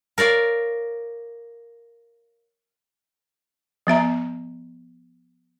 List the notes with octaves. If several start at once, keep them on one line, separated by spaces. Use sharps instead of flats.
A#4 C#5 D5 F5
F3 B3 E5 A#5